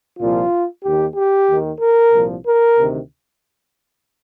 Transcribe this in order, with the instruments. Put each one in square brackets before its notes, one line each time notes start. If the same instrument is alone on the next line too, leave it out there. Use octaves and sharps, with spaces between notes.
[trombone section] C2 A#2 F3 F4
D#2 D#3 G4
G4
D#2 D#3
A#4
C2 A#2 F3
A#4
D2 C3 D#3